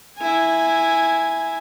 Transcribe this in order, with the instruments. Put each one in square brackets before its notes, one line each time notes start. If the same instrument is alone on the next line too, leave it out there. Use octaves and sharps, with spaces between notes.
[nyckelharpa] E4 G#5